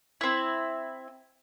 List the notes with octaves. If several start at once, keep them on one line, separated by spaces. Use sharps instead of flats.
C4 E4